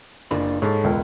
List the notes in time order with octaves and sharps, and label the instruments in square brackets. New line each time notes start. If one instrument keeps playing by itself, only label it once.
[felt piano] F#1 [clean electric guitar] D4 F4 B4
[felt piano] G#2 [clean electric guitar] A4 C#5
[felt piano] E1 C#2